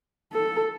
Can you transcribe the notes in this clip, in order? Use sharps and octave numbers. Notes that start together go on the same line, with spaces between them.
A4